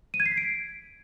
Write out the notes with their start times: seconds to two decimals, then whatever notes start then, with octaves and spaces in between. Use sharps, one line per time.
0.14 D#7
0.20 G#6
0.26 C7
0.32 B6
0.37 D7